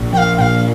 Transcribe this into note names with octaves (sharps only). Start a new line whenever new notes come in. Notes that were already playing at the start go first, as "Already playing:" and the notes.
Already playing: A#1
F3 G5
F5
A#2 F5 G5